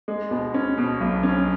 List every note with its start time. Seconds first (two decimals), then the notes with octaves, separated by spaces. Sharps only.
0.08 G#3
0.31 B2
0.54 C#4
0.78 B2
1.01 B1
1.23 C#4